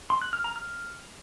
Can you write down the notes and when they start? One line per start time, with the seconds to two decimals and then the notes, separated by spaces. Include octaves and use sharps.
0.10 C6
0.22 F#6
0.33 F6
0.44 A#5
0.56 F6